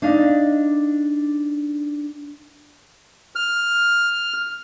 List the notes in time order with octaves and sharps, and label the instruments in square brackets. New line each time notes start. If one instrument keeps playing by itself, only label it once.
[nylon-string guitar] D4 D#4 F5
[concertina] F6